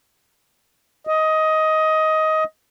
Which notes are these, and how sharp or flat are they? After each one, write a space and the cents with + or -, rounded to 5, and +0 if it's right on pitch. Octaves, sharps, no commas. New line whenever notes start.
D#5 +15